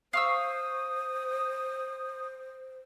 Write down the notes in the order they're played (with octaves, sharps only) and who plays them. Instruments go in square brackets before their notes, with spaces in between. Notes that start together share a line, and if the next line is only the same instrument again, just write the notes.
[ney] C5 [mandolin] F5 C#6 E6 [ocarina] D#6